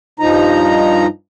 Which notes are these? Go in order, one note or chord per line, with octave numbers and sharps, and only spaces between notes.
G2 F3 D#4 A#5